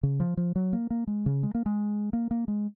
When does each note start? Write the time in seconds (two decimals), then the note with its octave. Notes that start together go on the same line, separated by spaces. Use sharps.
0.03 C#3
0.20 F3
0.37 F3
0.56 F#3
0.73 A#3
0.90 A#3
1.07 G#3
1.26 C#3
1.43 G#3
1.55 A#3
1.66 G#3
2.13 A#3
2.31 A#3
2.48 G#3